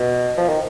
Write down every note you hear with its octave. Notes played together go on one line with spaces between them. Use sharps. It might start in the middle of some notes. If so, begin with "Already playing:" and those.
Already playing: B2
F3
D#3